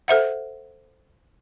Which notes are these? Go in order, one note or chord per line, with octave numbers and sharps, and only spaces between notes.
A4 C5 E5 F#5